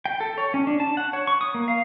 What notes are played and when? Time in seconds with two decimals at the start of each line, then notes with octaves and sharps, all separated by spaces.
0.06 G5
0.20 A4
0.38 C#5
0.54 C#4
0.67 D4
0.80 A5
0.97 F#5
1.13 C#5
1.27 C#6
1.41 D#6
1.54 A#3
1.68 F5